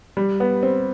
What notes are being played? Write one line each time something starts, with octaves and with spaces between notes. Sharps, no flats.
G3
B3
C4